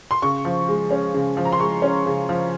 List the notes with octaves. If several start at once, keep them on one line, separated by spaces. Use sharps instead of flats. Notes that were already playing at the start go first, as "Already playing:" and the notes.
C6
C#3 C#6
F3
G#3
C#4
C#3
F3
A#5
C6
G#3 C#6
C#4
C#3
F3